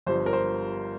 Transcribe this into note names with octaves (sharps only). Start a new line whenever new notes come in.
G1 G2 F3 C5
A#4
C5